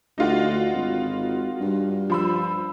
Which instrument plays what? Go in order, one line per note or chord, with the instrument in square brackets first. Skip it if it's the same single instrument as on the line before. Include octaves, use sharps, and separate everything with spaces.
[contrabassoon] D2 [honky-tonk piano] D#4 F4 F#4
[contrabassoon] G#1
G2
[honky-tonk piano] F3 B5 E6